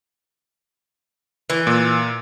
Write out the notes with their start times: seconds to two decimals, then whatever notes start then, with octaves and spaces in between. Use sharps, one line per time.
1.50 E3
1.67 A#2